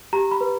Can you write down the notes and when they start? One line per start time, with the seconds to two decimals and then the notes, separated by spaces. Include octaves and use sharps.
0.13 G4 A#5
0.31 B5
0.41 B4